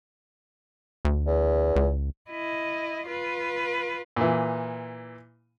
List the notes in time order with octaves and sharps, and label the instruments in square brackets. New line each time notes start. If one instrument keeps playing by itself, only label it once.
[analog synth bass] D2
[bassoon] E2
[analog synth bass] C#2
[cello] E4 D#5
F4 B4
[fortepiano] A#2 E3